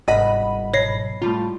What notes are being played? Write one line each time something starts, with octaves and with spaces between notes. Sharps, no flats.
G1 C2 G#2 D#5 F#5 B5
B1 C#5 A#6 C7
A2 C3 G3 F4